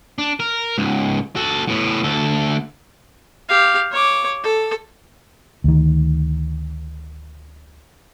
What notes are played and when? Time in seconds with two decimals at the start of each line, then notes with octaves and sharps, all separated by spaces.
0.18 D4
0.40 A#4
0.78 C#2 G#2
1.36 F#4 A4
1.68 A2 B3
2.03 D2 A4
3.49 G4 F5
3.92 C#5 D6
4.44 A4
5.64 D2 D#3